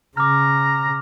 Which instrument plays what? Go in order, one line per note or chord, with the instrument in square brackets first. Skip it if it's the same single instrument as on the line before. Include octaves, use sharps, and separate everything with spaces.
[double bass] C#3 [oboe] A#5 [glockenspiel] D6 F6